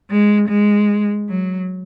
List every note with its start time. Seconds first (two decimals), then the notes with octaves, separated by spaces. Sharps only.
0.10 G#3
0.49 G#3
1.29 F#3